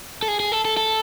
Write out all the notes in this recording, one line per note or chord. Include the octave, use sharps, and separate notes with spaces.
A4
G#4
G#4
A4
A4
A4